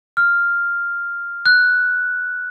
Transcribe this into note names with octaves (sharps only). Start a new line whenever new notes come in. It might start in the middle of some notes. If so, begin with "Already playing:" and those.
F6
F#6